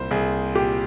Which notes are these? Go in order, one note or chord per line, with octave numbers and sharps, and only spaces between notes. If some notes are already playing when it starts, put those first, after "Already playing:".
Already playing: C2 A#2 C5
C2 G#4
A#2 G4